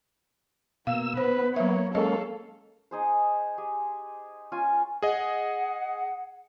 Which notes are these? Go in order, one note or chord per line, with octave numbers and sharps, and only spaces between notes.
B2 A#3 F5 E6
B3 B4 C5
F#3 A#3 C#5 E5
G#3 A#3 C#4 A4 D#5 F5
D#4 G#4 C5
G4 G#4
C#4 F4 G#5
G#4 D#5 F#5